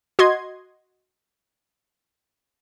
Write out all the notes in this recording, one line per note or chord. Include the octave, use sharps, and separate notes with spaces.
F#4 D#5 C6 G#6